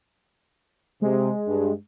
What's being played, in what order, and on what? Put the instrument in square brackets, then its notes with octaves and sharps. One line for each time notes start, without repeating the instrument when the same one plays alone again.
[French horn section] C3 [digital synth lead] G#3
[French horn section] G2